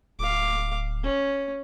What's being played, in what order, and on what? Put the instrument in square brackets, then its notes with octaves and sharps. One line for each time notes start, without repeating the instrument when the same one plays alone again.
[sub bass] D1 [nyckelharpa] F5 D6
[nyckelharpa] C#4